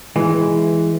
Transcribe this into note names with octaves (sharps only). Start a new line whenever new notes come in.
E3 G#3